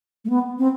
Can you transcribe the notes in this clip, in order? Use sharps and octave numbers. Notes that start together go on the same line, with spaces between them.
A3
B3
C4